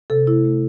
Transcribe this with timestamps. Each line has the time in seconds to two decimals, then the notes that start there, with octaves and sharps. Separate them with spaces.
0.10 C3 A4
0.27 A3 E4
0.45 A3